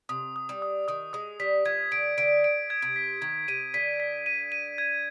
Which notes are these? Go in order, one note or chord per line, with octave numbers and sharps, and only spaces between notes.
C3 D#6
D#6
G3
D#6
D#3 D#6
G#3 D#6
G3 B6
F3 G#6
D3 D7
D3 D7
D7
G#6
C3
B6
D#3 G#6
C3 D#7
D3 B6
B6
D#7
D#7
G#6